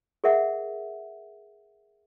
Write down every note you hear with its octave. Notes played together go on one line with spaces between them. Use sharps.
G#4 A#4 E5 F#5